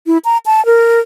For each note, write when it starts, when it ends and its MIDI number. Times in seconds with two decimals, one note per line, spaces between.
0.07 0.18 64
0.25 0.38 82
0.46 0.64 81
0.66 1.00 70